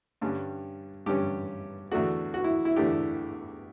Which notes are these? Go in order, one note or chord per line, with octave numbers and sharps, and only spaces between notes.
G2 D3 G3 C#4
G2 D3 G3 C#4 G4
E2 D3 A3 D4 F#4
F#4
E4
E4
E2 D3 A3 D4 G4